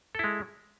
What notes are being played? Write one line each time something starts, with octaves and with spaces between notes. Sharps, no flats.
G#3 E4 A4